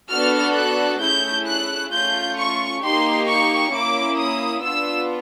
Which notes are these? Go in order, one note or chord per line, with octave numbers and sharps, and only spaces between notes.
B3 D4 F#4 A4 F6
F#6
A3 C#4 E4 G#4 G6
F#6
A3 C#4 F4 G6
C#6
A#3 D#4 G4 C6
C#6
A#3 C#4 E4 D6
D#6
B3 D4 F4 E6